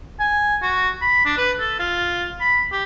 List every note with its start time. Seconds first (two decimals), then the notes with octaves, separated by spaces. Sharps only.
0.20 G#5
0.62 F#4
1.01 B5
1.25 D4
1.37 B4
1.60 A4
1.79 F4
2.41 B5
2.72 G4